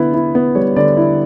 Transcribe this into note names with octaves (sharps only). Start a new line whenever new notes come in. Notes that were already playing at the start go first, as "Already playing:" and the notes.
Already playing: D3 B3 E4 B4
E4
B3
G3 C#5
D3 D5
E4